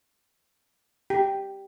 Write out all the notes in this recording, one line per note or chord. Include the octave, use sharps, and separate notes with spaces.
G4